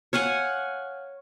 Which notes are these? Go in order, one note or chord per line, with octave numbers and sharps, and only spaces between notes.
C#5 F5 F#5 G#5